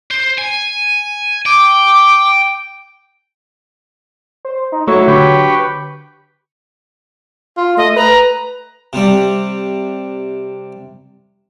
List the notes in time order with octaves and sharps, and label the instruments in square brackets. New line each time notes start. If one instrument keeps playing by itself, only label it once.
[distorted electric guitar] C5
G#5
[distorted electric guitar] G5 [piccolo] D6
[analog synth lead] C5
D#4
[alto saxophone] F#3 [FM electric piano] A3 [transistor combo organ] E4 [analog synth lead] C#6
[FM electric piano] D3 [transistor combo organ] G4 B4
[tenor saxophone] F4
[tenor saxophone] A3 [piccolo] D#5
[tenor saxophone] B4 [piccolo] A#5
[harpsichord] C3 G3